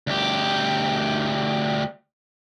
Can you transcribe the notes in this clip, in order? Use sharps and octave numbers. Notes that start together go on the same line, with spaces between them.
D2 G4